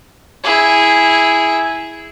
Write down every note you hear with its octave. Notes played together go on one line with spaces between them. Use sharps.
E4 G#4